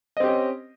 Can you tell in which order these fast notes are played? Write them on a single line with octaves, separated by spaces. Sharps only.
D#5 C4 G4 C#4